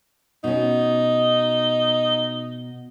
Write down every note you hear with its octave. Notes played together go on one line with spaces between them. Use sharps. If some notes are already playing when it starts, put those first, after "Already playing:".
B2 C#4 D#4